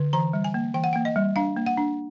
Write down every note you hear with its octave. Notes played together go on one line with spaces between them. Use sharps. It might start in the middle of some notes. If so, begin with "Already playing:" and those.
Already playing: D3
E3 A#5
G3
G#5
A#3
E3 G5
F#5
A#3 G5
D#5
G3
D4 F5
A#3
F#5
D4